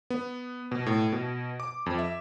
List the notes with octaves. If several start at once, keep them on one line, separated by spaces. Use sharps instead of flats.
B3
B2
A2
B2
D6
F2
E5